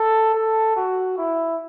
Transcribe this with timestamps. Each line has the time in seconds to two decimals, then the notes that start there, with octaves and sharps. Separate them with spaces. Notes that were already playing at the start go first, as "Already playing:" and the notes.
Already playing: A4
0.34 A4
0.76 F#4
1.18 E4